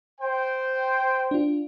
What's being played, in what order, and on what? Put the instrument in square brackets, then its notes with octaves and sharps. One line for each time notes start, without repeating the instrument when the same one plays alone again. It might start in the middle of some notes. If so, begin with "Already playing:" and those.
[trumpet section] C5 G5
[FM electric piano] D4 F4